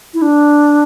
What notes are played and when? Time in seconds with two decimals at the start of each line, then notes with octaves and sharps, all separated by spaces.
0.14 E4
0.22 D4